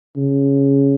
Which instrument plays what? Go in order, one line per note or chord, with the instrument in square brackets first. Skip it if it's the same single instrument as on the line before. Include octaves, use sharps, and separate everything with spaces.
[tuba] C#3